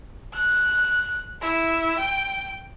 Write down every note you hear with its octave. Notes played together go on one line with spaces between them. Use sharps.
F#6
E4
G5